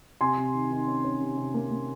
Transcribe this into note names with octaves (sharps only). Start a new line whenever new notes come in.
C3 G#5 C6
C3
D#3
D#3
C#4
C#4
C3
C3
A#3
A#3